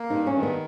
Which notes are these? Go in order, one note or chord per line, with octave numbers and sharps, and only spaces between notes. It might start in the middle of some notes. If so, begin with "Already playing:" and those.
Already playing: A#3
G2 D#4
C#4
D#3
B3